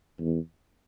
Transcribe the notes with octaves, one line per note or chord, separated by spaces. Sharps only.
E2